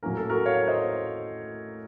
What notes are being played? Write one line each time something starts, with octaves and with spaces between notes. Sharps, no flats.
A2 F#3 A#3 C#4 A#4
A4
F#4 A#4
C#5 F5
C5 D#5